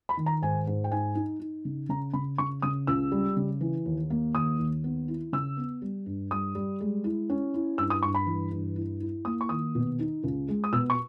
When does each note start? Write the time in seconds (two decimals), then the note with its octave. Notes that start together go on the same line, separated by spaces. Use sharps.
0.09 B5
0.17 D#3
0.26 A#5
0.42 G#2 G#5
0.67 G#2
0.84 G5
0.91 D#4 G#5
1.15 D#4
1.40 D#4
1.65 C#3
1.89 C#3 A#5
2.13 C#3 B5
2.38 C#3 C#6
2.62 C#3 D#6
2.87 C#2 E6
3.12 G3
3.36 C#3
3.61 E3
3.85 D#2
4.10 A#3
4.35 D#2 D#6
4.59 D#2
4.84 B3
5.08 E4
5.32 C#3 E6
5.57 B3
5.82 G3
6.06 G2
6.31 G3 D#6
6.55 G3
6.81 G#3
7.04 E4
7.30 C#4
7.54 E4
7.78 G2 E6
7.90 D#6
8.03 G2 C#6
8.15 B5
8.27 E3
8.51 G2
8.76 E4
9.00 E4
9.25 A#3 D#6
9.41 C#6
9.49 D#3 D#6
9.75 B2
9.99 D#4
10.24 C#2
10.48 G#3
10.64 D#6
10.73 B2 E6
10.90 C#6